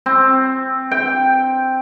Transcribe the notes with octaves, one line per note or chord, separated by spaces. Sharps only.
C4
G5